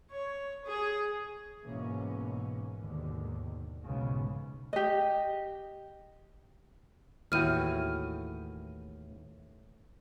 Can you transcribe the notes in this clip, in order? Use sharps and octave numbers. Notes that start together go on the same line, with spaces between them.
C#5
G#4
G#2 B2 E3 A#3 C#4
D#2 G#2 B2 D3 D#3
B1 G#2 C#3 E3 G#3 B3
G4 D#5
D#2 A2 E3 E4 F#4 G5 F6 D#7